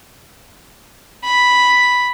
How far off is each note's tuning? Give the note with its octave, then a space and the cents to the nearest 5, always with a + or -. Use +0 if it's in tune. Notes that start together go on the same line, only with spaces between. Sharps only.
B5 +0